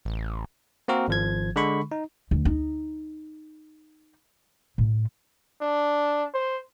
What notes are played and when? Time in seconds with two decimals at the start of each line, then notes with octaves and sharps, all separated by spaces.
0.05 A1
0.88 A#3 C4 F#4 A#4
1.08 G#1 F3 G#6
1.56 D3 G#3 B5 C#6
1.92 D#4
2.31 D2
2.45 D#4
4.78 A2
5.61 D4
6.34 C5